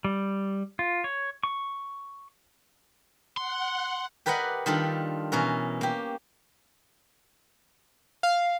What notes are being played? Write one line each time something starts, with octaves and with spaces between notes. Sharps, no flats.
G3
F4
C#5
C#6
F#5 C6
G4 A#4 B4 D5 D#5 F#5
D#3 G3 D4 F4 A4
B2 E3 C#4 A#4
A#3 G4
F5